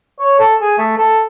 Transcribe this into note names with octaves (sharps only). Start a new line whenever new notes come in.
C#5
A4
G#4
A3
A4